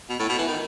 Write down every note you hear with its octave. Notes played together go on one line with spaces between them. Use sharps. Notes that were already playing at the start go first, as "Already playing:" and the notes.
B2
A2
B2
E3
D#3